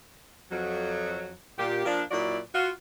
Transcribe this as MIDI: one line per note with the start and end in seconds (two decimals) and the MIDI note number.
0.51 1.33 41
0.51 1.33 54
1.59 1.86 46
1.59 1.86 67
1.86 2.03 53
1.86 2.03 58
1.86 2.03 62
2.11 2.39 46
2.11 2.39 54
2.11 2.39 64
2.11 2.39 74
2.54 2.70 65
2.54 2.70 66